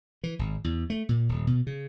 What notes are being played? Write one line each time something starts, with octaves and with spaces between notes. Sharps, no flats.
E3
G#1
E2
A3
A#2
D#1
B2
C#3